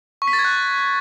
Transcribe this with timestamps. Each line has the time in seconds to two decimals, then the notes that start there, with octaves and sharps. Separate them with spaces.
0.22 C#6
0.27 B6
0.33 A6
0.39 G#6
0.45 F#6